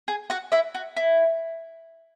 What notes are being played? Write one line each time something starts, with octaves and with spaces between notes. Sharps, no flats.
G#4
F#4 F#5
E4 E5
F#4
E4